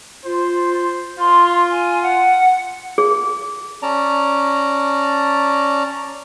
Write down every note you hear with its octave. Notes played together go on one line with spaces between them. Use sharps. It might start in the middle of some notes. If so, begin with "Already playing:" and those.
F4 C5
F4 C6
G#5
F#5
G#4
C#4 D5 A5 A#5